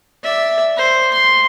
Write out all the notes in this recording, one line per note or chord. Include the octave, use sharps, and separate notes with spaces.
D5 E5
C5
C6